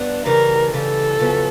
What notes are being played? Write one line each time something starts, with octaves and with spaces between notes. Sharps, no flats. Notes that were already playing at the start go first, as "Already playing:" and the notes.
Already playing: G2 B3 D4
C#3 E3 G3 A#4
C#3 E3 G3 A4
F2 C#3 F#3 B3